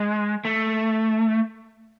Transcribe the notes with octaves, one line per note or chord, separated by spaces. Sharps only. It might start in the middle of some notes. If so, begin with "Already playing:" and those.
Already playing: G#3
A3